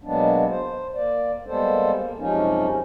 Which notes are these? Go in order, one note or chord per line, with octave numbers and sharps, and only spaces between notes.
B2 F#3 G#3 A#3 B3 D4
C5
A#3 D5
G3 G#3 A#3 B3 A4 C5
A#3
F#2 C3 F3 G#3 C#4 D#4